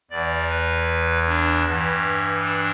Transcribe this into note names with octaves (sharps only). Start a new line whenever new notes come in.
E2 E3 D5
B4
D4
G2 E3
D4